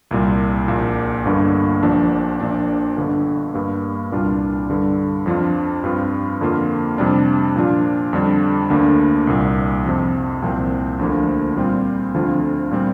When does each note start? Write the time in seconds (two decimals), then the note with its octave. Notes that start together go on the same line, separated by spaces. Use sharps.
0.11 C2 A#2 G3
0.68 A#1 A#2 A#3
1.25 G1 G2 D3 A#3
1.83 A#1 A#2 F3 D4
2.40 A#1 A#2 F3 D4
2.97 G1 G2 D3
3.54 G2 G3 A#3
4.12 C2 A#2 G3 D4 F4
4.69 G2 D3 G3
5.26 F2 F3 D4 F4
5.84 G2 G3 C4 F4
6.41 F2 D3 A#3 F4
6.98 F2 C3 G3 D4
7.56 A#2 F3 D4 F4
8.13 F2 D3 G3 D4
8.70 D2 D3 A#3 D4
9.27 C2 A#2 G3
9.85 F2 C3 F3
10.42 C2 A#2 F3 C4
10.99 D2 D3 F3 A#3
11.57 A#2 G3 C4 F4
12.14 D2 D3 F3 C4 F4
12.71 A#2 G3 C4 F4